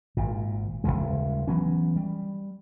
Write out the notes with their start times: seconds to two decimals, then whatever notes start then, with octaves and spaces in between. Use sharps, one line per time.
0.17 G#1 A#2
0.84 D#1 D#2 C#3 G#3
1.48 E3 F#3 B3 C#4
1.96 G3